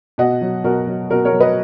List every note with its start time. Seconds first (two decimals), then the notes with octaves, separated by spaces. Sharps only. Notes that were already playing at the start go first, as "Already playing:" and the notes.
0.18 B2 D#5 F#5
0.41 F#3
0.64 B2 F#4 A#4
0.87 F#3
1.10 B2 F#4 A#4
1.25 A#4 C#5
1.32 F#3
1.40 B4 D#5